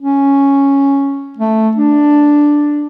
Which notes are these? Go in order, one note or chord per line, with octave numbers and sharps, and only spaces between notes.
C#4
A3
D4